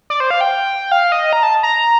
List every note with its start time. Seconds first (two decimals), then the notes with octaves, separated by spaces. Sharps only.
0.10 D5
0.20 C5
0.31 F5
0.41 G5
0.92 F5
1.12 D#5
1.33 A#5
1.43 A5
1.63 A#5